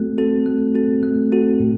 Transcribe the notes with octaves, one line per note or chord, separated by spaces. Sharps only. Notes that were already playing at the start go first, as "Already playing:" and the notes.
Already playing: A3 C4 F#4 A4
C4 F#4 A4
A3
C4 F#4 A4
A3
C4 F#4 A4
A2